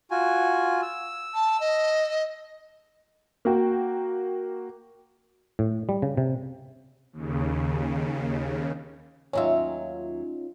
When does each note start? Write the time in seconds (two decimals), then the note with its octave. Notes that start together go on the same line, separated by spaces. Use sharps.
0.11 F4 F#4 G#5
0.82 E6
1.34 A5
1.60 D#5
3.45 A#3 F#4 G5
5.59 A2
5.89 G3
6.02 C#3
6.17 C3
7.13 D#2 C#3
9.33 D#2 F#3 C#4 D#4 F4 E5